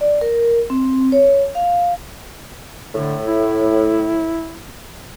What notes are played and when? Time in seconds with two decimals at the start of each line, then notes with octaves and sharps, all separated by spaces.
0.01 D5
0.21 A#4
0.70 C4
1.12 C#5
1.55 F5
2.95 A2 D3
3.27 E4